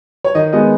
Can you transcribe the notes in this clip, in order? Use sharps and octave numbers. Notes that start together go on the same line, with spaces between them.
C#5
D#3 D#5
G#3 B3 D#5